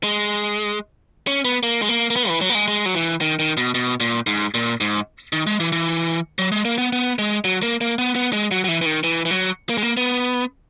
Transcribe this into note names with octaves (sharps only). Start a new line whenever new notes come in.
G#3
C#4
B3
A#3
G#3
A#3
A#3
B3
E3
F#3
A#3
G#3
G#3
F#3
E3
D#3
D#3
B2
B2
A#2
G#2
A#2
G#2
D#3
G#3
E3
E3
F#3
G#3
A#3
B3
B3
G#3
F#3
A#3
A#3
B3
B3
G#3
F#3
F#3
E3
E3
D#3
E3
E3
F#3
A#3
G#3
A#3
B3